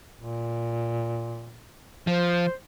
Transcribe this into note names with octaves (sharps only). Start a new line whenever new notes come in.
A#2
F3 C5